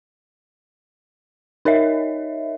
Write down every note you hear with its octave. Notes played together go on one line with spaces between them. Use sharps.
D#4 A#4 C#5 D#5 E5